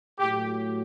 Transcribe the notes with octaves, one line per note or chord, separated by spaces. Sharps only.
A2 F#3 G4